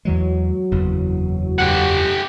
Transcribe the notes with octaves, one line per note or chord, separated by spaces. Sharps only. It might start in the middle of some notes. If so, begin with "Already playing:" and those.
E2 E3 F#3 G#3
F#1 E2 E3
G4 F#5